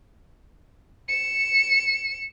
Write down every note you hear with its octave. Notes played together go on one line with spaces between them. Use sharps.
C#7 E7